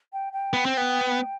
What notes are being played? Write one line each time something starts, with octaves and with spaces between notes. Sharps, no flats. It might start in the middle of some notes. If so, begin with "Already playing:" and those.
G5
G5
B3
C4
B3